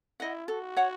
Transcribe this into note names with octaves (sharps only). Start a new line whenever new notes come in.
E4 D#5 F#5
F#4 A4
C#5 F#5